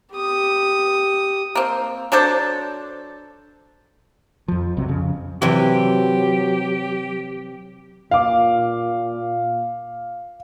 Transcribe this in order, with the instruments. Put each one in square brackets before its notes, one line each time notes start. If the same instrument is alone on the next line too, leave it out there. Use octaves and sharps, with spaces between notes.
[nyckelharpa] G4 D#6
[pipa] A#3 C4
F#3 D4 A4 C5
[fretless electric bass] F2 F3
B1 C3 F#3
F2 C#3
[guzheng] C3 E3 [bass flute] F#3 [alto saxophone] G4
[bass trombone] A#2 [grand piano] F5 D6